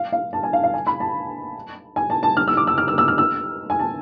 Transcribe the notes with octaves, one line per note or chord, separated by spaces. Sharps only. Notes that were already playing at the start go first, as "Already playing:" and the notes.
Already playing: F5
F5
A5
G#5
F5
F5
G#5
B5
A5
G#5
A5
A5
F6
E6
D6
E6
F6
E6
E6
F6
E6
G#5
A5